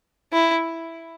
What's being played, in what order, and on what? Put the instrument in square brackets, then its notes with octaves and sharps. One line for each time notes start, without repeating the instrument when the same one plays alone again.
[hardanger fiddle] E4